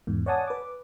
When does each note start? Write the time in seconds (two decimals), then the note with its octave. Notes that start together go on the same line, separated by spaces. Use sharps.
0.07 E2 G#2
0.26 C#5 D5 F#5 G#5 A5 D#6
0.47 B4 D6